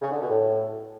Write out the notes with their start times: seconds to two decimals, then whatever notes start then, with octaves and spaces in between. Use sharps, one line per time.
0.02 C#3
0.11 D3
0.20 B2
0.30 A2